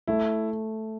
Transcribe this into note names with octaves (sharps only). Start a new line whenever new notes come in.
A3 E4